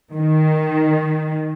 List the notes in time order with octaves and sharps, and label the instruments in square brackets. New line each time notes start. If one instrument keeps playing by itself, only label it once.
[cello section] D#3